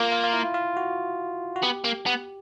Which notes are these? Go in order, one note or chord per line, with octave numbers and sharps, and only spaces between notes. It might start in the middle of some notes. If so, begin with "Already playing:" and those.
Already playing: A#3 F4
F4
F4
E4
F4
F#4
F#4
B3 G4
A#3
B3